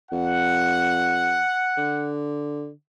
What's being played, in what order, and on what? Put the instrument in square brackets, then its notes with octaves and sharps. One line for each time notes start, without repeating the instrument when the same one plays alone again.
[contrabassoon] F2 [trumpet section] F#5
[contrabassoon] D3